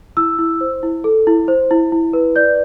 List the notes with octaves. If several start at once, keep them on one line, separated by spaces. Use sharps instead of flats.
E4 E6
E4
C5
E4
A4
E4
C5
E4
E4
B4
D5 G6